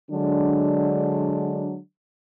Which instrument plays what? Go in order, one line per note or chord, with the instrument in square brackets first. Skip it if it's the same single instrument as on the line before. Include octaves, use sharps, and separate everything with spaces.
[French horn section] D3 F#3 G#3 D4